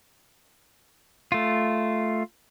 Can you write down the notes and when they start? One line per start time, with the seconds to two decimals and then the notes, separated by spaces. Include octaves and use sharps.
1.32 A3 F4